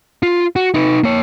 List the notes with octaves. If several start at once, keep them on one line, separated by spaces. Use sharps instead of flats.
F4
F#4
D#4 B4
A#3 C#5